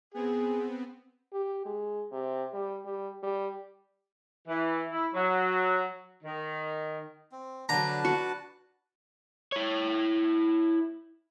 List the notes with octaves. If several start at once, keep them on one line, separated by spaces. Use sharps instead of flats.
B3 C4 G#4
G4
G#3
C3
G3
G3
G3
E3
E4
F#3
D#3
C4
D3 F#3 D4 B4 A5 A#5
F#4
E4 C#5